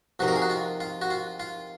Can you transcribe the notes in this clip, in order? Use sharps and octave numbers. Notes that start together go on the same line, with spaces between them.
F2 C3 D#3 F#4
A#4
G#4
F#4
F4
F4
F#4
F4
F4